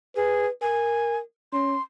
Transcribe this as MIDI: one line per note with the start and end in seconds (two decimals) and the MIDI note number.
0.16 0.46 68
0.16 0.50 71
0.62 1.21 70
0.62 1.17 80
1.53 1.76 61
1.53 1.82 84